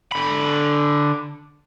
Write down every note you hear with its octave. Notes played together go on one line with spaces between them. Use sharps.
D3 B5